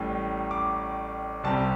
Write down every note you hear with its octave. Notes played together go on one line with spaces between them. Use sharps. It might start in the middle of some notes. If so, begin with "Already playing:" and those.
Already playing: A1 A2 G3
D6
C2 C3 G3 A5